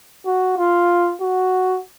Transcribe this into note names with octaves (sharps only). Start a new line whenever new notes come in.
F#4
F4
F#4